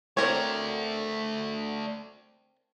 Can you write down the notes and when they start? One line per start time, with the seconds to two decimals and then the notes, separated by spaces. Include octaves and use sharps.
0.17 A3 C4 A#4 C#5 D5